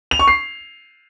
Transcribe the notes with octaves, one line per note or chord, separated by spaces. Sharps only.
F7
C#6
C7